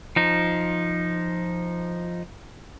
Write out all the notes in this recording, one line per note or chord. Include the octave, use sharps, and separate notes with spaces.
F3 D#4